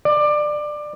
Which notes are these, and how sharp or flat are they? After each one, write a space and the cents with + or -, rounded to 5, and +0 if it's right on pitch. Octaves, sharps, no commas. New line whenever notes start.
D5 +20